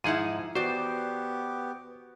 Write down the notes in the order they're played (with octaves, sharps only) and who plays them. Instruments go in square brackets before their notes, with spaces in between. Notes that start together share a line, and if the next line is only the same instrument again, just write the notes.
[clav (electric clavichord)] G#2 G#4 F#5 [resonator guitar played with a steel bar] F3 D#4 E4 [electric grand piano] D#7
[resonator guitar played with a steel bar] E2 D5 [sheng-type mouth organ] B3 G4 [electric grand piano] F#4 [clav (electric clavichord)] C5